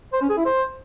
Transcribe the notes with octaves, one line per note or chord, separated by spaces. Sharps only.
C5
C#4
G#4
E4
C5